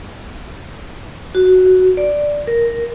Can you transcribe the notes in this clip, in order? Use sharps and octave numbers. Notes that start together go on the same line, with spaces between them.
F#4
D5
A#4